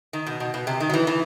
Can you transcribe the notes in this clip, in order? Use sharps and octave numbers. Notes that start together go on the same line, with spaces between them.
D#3
B2
B2
B2
C3
D#3
F#3
E3
E3